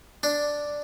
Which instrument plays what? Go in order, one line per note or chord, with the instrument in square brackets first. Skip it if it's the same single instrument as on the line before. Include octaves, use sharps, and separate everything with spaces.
[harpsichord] D4